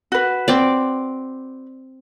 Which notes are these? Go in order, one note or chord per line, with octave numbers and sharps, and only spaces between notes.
F#4 B4
C4 D5